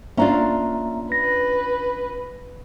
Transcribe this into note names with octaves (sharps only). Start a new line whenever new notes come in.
A#3 C#4 D4 F4 E5 A#5
B4 A#6